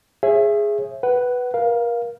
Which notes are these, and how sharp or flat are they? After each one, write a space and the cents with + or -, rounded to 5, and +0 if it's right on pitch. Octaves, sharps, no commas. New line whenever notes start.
G#4 +0 C#5 -40 E5 +20
B4 +0 F#5 +25
A#4 +30 F5 +0